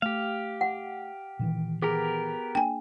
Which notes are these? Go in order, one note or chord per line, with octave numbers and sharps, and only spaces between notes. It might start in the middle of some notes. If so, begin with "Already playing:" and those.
A3 G4 F5
F#5
A#2 D#3 E3
B3 G4 G#4 A#4
A#3 D4 G5 G#5